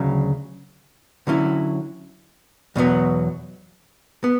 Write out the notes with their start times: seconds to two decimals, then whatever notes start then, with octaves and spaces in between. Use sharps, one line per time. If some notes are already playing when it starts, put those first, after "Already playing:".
Already playing: D2 C#3 F#3
1.27 D3 F#3 C#4 E4
2.76 E2 B2 F#3 B3
4.24 B3